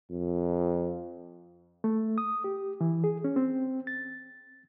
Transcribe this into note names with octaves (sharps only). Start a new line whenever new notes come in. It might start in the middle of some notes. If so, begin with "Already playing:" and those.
F2
A3
D#6
G4
E3
G#4
C#4
C4
A6